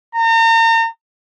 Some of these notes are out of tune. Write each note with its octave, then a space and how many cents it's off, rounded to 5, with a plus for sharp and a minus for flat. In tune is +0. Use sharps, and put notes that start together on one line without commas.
A#5 -40